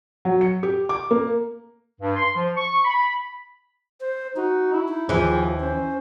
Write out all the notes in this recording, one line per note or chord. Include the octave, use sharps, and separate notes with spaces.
F#3
C#7
G4
D6
A#3
G2
C6
F3
C#6
B5
C5
D#4 F#4
E4
D#4
D#2 E3 F3 G#4
C#4 C5